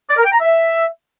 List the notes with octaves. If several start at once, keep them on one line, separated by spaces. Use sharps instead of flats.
D5
A#4
G5
A#5
E5